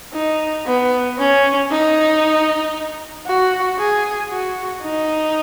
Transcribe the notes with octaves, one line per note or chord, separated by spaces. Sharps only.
D#4
B3
C#4
D#4
F#4
G#4
F#4
D#4